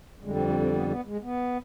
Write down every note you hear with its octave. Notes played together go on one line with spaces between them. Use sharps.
F2 D3 G3 G#3
C4
C4
C4
B3
B3
G#3
B3